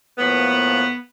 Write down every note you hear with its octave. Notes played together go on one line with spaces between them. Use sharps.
A2 F3 A#3 B3